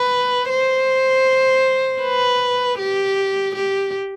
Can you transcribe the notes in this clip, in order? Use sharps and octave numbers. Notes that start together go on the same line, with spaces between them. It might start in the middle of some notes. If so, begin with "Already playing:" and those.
Already playing: B4
C5
B4
G4
G4